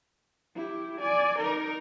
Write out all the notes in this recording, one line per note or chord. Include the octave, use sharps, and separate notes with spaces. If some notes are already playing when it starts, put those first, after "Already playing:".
E4 G4
D5 G#5
D#4 A#4